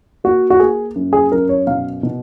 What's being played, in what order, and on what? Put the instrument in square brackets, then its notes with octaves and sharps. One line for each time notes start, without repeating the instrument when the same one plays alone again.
[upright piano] A#3 F#4
F#4
A#3 G#4
F#2
G#4
F#2 A#4
C#5
B2 F5
B2